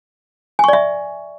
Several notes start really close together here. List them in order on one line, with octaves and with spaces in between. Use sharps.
G#5 C#6 D5 E5